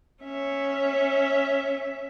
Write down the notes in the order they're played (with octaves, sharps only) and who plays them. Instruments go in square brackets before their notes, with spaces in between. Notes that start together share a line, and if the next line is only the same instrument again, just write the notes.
[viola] C#4 E5